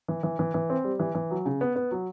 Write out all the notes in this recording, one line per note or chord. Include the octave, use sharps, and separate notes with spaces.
E3
E3
E3
E3
C4
G3
E3
E3
F#3
C#3
B3
B3
F#3